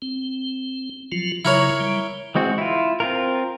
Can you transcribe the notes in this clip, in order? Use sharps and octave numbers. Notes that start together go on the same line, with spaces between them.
C4
F3 F#3 F4
C#3 F#3 E4 A#4 C#5
G3
E3 G#3 C4 F#4
E4 F4
C4 F4 A#4